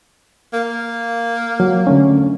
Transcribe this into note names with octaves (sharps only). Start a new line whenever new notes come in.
A#3
F#3
D3 A3 C#4